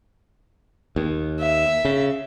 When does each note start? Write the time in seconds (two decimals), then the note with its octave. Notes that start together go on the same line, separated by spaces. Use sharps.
0.96 D#2
1.40 E5
1.85 C#3